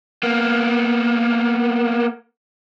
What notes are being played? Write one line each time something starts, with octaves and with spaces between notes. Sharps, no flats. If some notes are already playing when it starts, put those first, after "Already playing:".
A#3 B3